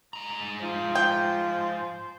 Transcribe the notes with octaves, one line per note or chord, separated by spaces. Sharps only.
G#2 A#5
F3 C5
G5